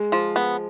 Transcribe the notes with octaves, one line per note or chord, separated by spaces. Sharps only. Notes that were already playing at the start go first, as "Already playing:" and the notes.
Already playing: G#3
F3
B3